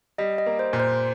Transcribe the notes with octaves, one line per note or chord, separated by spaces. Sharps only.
G3 D#5
D#5
A#3
C5
A#2
C5